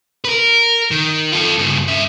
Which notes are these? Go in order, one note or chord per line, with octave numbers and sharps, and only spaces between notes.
A#4 B4
D#3
F4 A4
G2 C#3
G2 E5